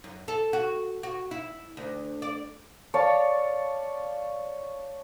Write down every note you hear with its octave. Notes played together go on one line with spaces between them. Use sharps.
F#2
A4
F#4
F#4
E4
D2
D5
C#5 D5 F5 A5